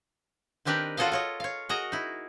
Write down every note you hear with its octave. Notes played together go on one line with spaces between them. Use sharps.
D#3 C4 D4 G4 A#4 B4
F4 F#4 A4 C#5 D#5 F5
F4 C#5 D#5
C#5 F5
F#4 G#4 A#4 D#5 A#5
D#4 E4